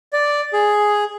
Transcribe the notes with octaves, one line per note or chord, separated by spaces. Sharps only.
D5
G#4